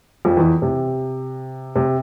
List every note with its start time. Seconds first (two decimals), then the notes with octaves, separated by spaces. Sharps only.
0.25 F2 F3
0.37 E2 E3
0.62 C3
1.76 C3